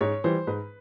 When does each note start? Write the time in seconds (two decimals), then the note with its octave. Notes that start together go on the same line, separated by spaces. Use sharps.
0.01 G#2 C#5
0.24 E3 G3 C5
0.47 G#2 B4